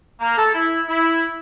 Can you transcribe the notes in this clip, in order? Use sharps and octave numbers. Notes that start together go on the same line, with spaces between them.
A#3
A4
E4
E4